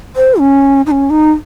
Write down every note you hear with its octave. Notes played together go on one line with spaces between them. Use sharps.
C5
C#4
D#4
C#4
D#4